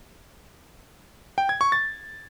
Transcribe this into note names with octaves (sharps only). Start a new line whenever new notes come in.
G5
G#6
C#6
A6